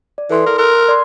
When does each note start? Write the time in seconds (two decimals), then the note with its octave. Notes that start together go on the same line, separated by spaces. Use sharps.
0.18 D5
0.30 E3 A4 C6
0.46 A#4
0.58 A#4 C6 E6 F#6
0.88 D5 C6